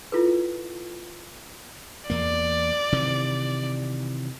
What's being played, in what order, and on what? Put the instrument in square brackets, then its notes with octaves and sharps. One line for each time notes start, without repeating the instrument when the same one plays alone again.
[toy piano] E4 F4 A4 B4
[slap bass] E2 A#3 [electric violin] D5
[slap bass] C3 D#3 E3